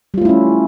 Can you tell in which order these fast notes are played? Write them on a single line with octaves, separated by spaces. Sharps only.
G3 F4 A3 E4 C#4